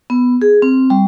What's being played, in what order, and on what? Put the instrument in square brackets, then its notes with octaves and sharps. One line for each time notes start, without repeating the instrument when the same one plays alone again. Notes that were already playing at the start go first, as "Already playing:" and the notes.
[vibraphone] B3
G#4
C4
G3